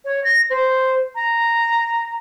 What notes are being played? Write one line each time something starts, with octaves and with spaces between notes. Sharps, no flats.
C#5
A#6
C5
A#5